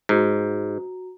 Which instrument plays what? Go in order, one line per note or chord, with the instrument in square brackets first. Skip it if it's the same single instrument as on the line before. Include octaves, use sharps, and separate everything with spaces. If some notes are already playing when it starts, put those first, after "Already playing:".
[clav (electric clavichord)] G#2 [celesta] F#4 A#5